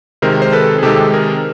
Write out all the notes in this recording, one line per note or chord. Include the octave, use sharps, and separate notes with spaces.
C3 D#3 G#3 A#4 C5
C5
A4 B4
G#4
C3 D#3 G#3 G4 A4
G#4 A#4